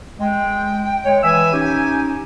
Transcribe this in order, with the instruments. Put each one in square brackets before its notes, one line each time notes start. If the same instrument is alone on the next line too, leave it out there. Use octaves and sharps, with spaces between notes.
[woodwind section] G#3 [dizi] G5
[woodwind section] G#3 C#5
[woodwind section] E3 E5 E6 [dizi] G#5
[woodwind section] C#4 D#4 G4